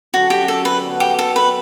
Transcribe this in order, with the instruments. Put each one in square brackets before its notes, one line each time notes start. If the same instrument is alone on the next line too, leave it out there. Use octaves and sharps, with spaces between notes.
[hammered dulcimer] D3 F#3 C#4 [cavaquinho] F#4
[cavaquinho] G4
A4
B4
[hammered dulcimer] D3 F#3 B3
[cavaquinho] G4
A4
B4